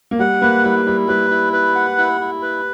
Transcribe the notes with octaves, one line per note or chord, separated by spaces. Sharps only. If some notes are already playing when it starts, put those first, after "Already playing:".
A#3
G3 F#5
A#3 B4
G3 E4
G3 E4
G3 B4
E4
B4
F#5
E4
E4
B4